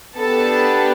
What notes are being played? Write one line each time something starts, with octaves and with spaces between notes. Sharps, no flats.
B3 D4 G4 A4 A5